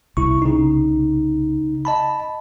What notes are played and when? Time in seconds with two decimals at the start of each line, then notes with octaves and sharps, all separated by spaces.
0.17 C2 E4 C#6
0.42 C#3 D#4
1.85 D#5 A5 B5